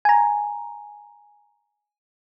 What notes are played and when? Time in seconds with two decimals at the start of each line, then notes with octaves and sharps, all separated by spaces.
0.05 G#5 A#5